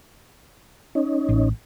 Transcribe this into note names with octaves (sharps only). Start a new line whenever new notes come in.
C#4 D#4
A1